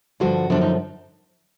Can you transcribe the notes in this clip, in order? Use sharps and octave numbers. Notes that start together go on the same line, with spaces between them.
G2 D3 F3 F#4
F#2 D3 F3 D4
D#4